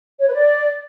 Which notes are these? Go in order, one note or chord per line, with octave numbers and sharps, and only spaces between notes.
C#5
B4
D5